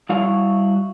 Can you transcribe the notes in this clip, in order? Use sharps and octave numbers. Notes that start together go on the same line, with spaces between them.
G3 E4 F#4 F5